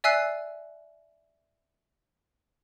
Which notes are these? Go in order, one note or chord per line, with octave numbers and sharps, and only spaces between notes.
D5 E5 G#5 E6 F#6 C7